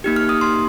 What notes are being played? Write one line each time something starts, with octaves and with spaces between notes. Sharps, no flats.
A#3 D#4 G4
F6
D#6
C6